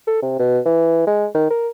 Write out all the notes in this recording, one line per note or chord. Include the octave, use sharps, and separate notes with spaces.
A4
C3
B2
E3
G#3
D#3
A#4